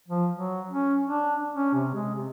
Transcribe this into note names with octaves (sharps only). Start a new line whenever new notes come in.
F3
F#3
C#4
D4
C#4
C3
G#3
C3